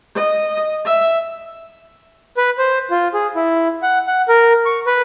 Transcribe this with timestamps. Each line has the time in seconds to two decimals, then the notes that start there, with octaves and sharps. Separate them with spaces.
0.15 D#5
0.85 E5
2.37 B4
2.58 C5
2.90 F4
3.14 G#4
3.35 E4
3.83 F#5
4.07 F#5
4.28 A#4
4.66 C#6
4.87 B4